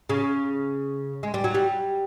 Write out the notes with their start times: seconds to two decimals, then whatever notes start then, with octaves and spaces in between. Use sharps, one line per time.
0.09 C#3
1.23 G#3
1.34 G3
1.44 F#3
1.54 G3